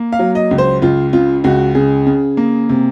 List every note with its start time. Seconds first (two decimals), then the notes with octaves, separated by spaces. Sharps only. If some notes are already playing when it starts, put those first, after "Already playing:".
Already playing: A#3
0.13 F5
0.19 F#3
0.35 D#5
0.51 C#2
0.58 C5
0.82 C#2 F4
1.13 C#3 F4
1.44 C#2 F#4
1.75 C#3 G#4
2.07 C#3
2.37 A#3
2.69 C3